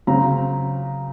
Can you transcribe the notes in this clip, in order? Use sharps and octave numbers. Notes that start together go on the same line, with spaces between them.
C#3 F#3 C4 A#5